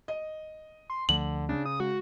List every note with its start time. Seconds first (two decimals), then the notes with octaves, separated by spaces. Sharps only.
0.08 D#5
0.90 C6
1.09 D2 D3 F3 A3 F#7
1.49 C#3 D4
1.66 D#6
1.80 G#3 F#4